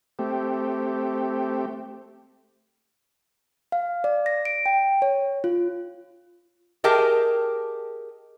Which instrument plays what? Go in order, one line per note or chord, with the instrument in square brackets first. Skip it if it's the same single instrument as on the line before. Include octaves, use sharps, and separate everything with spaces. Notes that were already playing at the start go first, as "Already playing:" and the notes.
[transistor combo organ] A3 C4 G4
[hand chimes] F5
D5
A#6
D7
G5
C#5
F4
[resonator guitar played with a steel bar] G4 G#4 A#4 D#5 G5 A5